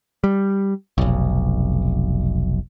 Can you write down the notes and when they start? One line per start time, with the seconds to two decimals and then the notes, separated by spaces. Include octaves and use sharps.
0.24 G3
0.98 F1 B1